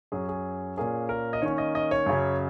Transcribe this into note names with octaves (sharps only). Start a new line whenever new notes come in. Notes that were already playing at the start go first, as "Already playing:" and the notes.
F#2 F#3 C#4 G#4
G#4
A#2 A#3 C#4 G#4
A#4
D#5
D#3 A#3 C#4 C#5
D#5
D#5
C#5
F#2 C#3 F#3